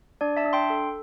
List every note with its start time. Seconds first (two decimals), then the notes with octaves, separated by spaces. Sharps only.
0.21 D4 D5
0.37 E5 A5
0.45 D4
0.53 G5 C6
0.70 A4